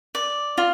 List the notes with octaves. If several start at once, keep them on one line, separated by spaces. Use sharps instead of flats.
D5
F4